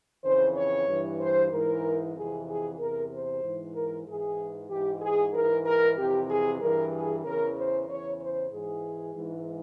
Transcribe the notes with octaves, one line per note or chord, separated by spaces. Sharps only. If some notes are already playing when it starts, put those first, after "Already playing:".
F2 C#3 E3 C5
C#5
G2 E3
C5
G#2 E3 A#4
F2 C3 E3 G#4
G#4
E2 C3 E3 A#4
C5
G#2 E3
A#4
G#2 E3 G#4
G#2 E3 G4
G#4
G#2 E3 A#4
A#4
F2 C3 E3 G4
G#4
G2 E3 A#4
G#4
E2 C#3 E3 A#4
C5
E2 C#3 E3 C#5
C5
G#2 E3 G#4
G#2 E3